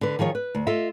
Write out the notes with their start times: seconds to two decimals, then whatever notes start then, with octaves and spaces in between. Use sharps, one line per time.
0.01 D3 B4
0.19 D#3 F3 G#4 C#5
0.35 B4
0.55 D2
0.67 F4 A4 D#5 E5